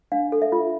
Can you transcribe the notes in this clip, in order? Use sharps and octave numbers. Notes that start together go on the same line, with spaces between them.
D4 F5
A4
E5
F4